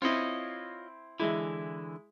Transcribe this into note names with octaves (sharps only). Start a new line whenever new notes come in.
C4 E4 F4 C#5 D#5
D3 E3 G#3 E4